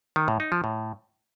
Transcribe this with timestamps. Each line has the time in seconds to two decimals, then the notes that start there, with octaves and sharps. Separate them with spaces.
0.16 D#3
0.28 A2
0.40 D#4
0.52 F3
0.64 A2